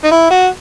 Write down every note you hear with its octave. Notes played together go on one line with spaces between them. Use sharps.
D#4
E4
F#4